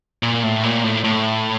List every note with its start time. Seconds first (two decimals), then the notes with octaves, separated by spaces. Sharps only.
0.23 A#2
0.43 A2
0.63 A#2
0.84 A2
1.04 A2